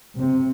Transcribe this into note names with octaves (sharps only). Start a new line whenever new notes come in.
C3